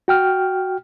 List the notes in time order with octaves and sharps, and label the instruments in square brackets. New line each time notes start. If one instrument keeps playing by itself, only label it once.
[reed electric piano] F#4 G5 F6